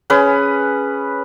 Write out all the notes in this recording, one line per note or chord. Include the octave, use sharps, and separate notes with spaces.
C#4 G#4 B4